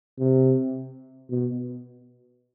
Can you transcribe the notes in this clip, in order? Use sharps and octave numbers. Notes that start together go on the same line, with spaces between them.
C3
B2